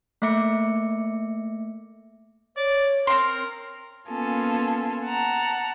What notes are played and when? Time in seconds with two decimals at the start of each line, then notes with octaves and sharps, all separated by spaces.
0.22 A3 A#3 E5 D6 C#7
2.57 C#5 D5
3.07 C4 A#4 C6
4.09 A#3 B3 C#4 F4 A4 G#5
5.05 F#5 A5 A#5